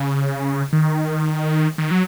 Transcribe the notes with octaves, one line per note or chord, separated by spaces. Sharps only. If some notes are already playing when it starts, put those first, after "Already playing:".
Already playing: C#3
D#3
D#3
F#3